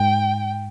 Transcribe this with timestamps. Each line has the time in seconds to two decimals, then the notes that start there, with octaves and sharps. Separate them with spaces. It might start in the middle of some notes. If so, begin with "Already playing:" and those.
Already playing: G#2 G5